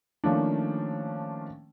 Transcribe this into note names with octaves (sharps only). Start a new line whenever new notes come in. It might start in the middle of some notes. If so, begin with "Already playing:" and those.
D#3 F3 A3 A#3 C#4 D4